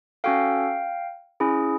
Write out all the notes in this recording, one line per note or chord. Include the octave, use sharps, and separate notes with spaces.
C#4 F#4 A4 F5 G5
C#4 E4 G#4